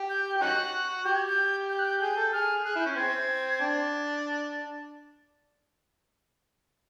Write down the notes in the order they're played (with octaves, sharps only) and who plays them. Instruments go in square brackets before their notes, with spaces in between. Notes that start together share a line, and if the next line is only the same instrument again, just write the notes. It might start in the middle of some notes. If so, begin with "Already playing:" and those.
Already playing: [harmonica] G4
[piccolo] G6
[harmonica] G4
[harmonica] C#4 D#4 F#4 [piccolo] F#6
[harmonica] G4 [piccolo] G6
[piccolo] G#6
G6
G6
F#6
G6
[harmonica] G#4 [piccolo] G6
[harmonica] A4
[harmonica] G#4 [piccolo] F6
[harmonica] G#4 [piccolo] F#6
[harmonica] E4 [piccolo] G6
[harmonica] C#4
[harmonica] C4 [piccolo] G#6
[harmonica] D4